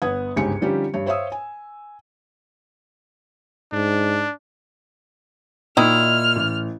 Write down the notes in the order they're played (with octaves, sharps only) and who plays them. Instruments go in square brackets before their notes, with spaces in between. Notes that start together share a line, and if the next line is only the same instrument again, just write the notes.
[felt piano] G1 B3 F#5 D#6 G#6
G1 C#2 G#2 G4 G#5 C#7
D3 F3 G3 C#4 D#4 G4
G2 C#5
C5 C#5 E5 F5 D#6 E6
G#5
[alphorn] G#2 [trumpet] D4
[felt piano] A#2 [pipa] D#3 D#4 E4 [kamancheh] F6
[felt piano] A1